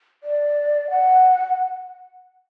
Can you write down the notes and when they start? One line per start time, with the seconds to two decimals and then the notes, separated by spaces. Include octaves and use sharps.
0.23 D5
0.90 F#5